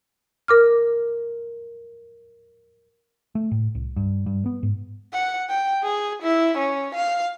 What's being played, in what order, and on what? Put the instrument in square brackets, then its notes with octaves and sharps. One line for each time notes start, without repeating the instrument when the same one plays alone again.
[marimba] A#4 D6 F6
[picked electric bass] A3
A2
C2
G2
G2
B3
G#2
[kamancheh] F#5
G5
G#4
E4
C#4
F5